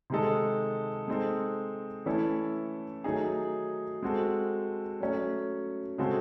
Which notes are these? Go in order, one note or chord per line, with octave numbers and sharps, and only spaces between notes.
C3 D#3 G#3 D#4 A4
G#3 C4 D#4 A4
E3 A3 C#4 E4 A4
D#3 F#3 A3 D#4 G#4
G#3 C4 F#4 A4
F#3 A3 C#4
C#3 G#3 C4 F#4 A4